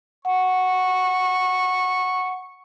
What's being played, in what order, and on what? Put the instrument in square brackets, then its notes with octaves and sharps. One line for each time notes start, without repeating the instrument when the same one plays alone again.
[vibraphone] F#5 [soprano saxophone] C#6